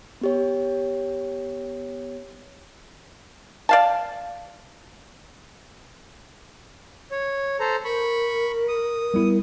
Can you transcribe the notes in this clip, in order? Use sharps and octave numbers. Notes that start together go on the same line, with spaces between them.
B3 G4 C#5
D5 F5 A5
C#5
A4 C5 A#5
A#4 B5 C#6
D#6
G3 B3 E4